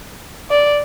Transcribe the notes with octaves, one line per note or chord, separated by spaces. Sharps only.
D5